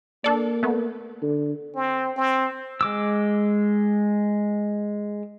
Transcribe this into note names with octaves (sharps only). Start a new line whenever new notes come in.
A#3 D4 A4 D5
A3 B3
D3
C4
C4
G#3 D6 E6